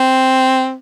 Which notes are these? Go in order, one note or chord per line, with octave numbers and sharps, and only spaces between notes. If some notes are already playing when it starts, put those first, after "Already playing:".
Already playing: C4